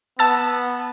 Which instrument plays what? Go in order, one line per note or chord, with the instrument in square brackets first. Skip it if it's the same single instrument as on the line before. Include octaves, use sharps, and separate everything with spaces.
[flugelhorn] B3 [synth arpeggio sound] A5 E6 A6